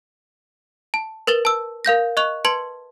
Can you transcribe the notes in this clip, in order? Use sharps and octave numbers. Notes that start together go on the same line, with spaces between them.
A5
A#4 B4 A6 E7 G7
A5 E6
A#4 F5 G6 A#6
D#5 C#6 F#6 F7
B4 A5 C6 G#6 C#7 F#7